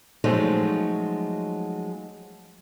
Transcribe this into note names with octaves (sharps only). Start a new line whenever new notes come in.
F3 F#3 G#3 A3 C#4 D#4